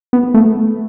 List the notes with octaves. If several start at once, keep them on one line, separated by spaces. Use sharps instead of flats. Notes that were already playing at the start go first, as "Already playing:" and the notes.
B3
A3